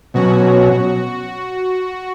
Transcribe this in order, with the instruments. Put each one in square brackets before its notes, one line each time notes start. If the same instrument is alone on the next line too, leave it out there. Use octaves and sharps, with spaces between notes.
[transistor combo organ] B2 F#3 C#4 [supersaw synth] F#4